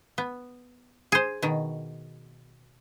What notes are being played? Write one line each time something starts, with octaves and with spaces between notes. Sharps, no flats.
B3
G#4 C5
B2 D#3